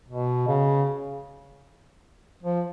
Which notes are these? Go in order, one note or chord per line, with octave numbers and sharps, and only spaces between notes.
B2
C#3
F3